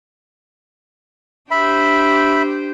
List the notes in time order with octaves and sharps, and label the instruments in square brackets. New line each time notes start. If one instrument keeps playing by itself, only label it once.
[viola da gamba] D4 G4 C5 [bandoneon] E5 B5